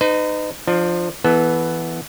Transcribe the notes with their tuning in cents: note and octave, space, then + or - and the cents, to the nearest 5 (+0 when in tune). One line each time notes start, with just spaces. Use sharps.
D#4 -20 B4 +45
F3 +0 D4 +30
E3 +0 B3 +0 A4 -30